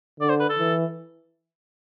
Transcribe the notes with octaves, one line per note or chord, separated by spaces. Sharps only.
D3 D5
C5
B4
A4
E3